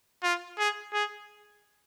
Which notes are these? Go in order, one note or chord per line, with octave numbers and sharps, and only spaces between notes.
F4
G#4
G#4